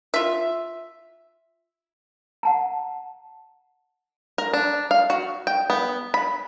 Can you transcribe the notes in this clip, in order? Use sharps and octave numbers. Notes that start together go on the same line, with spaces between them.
F4 E5
F#5 A5 A#5
A#4
D4
F5
F#4
G5
B3
B5